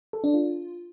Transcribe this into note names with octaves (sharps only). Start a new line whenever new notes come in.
A4
D4
F4